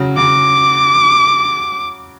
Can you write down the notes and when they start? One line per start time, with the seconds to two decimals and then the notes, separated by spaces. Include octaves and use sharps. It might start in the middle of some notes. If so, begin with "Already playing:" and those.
Already playing: C#3 F#3
0.17 C#3 D6